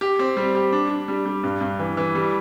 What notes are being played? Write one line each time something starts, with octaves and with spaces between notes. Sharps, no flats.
G4
C4
G3
G4
D4
D4
G3
G3
G2
G2
E3
E3
G3